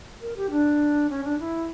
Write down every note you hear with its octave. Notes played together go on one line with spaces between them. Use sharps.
A#4
G4
D4
C#4
D4
E4